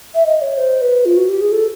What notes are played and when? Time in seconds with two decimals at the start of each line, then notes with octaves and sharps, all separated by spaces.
0.15 E5
0.26 D#5
0.42 C#5
0.57 C5
0.81 B4
1.05 F4
1.17 F#4
1.29 G4
1.41 G#4
1.52 A4